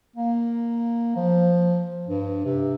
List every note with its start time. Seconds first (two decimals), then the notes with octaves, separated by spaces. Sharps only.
0.16 A#3
1.16 F3
2.07 G2
2.45 C3